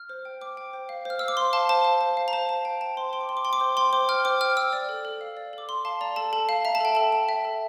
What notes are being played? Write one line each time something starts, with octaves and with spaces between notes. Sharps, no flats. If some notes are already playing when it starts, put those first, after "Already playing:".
Already playing: F6
C5
G5
C5 D6
G5
C5
F5
C5 F6
F5 E6
D6
C5 C6
F5 A5
C5 A5
F5
C5
F5
A#5
C5 A5
F5 A5
C5 G5
G5 A5
C5 C6
G5 C6
D6
C5 C6
D6
G5 C6
D6
C5 C6
G5 C6
C5 D6
G5 F6
C5 D6
G5 F6
C5 E6
D5
A4
A4
F5
D5
A4 D6
A4 C6
F5 A5
D5 A#5
A4 A5
A4 A5
F5
E5 A#5
A5
A4 G5
A4 A5
G5
E5
A4